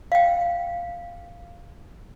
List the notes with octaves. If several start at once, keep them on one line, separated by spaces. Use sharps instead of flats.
F5 G5